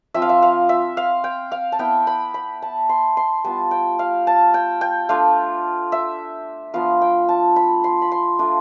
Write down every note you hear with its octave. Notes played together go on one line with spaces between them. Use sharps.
F3 C4 F4 E5
F5
E5
F5
E5
F5
G5
F5
A5
B3 E4 G5
B5
B5
A5
C6
C6
G3 B3 F4 A5
G5
F5
A5
G5
G5
A3 D4 F4 F5
E5
F3 B3 D4 F4 F5
G5
A5
B5
C6
B5
C6
A3 D4 F4